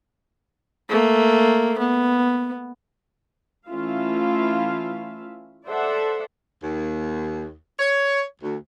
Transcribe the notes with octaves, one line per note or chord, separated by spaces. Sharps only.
A3 A#3
B3
E3 A3 C#4 F4 E5 F5
A4 C5 D5 E5 F#5
D#2
C#5
D2